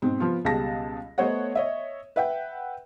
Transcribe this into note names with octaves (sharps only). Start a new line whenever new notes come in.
G#2 B2 C4
F3 B3 F4
C#2 B2 G3 G#4 A5 A#6
A3 B3 C5 C#5 D#5 F#5
C#5 D#5 E5
B4 E5 F#5 G5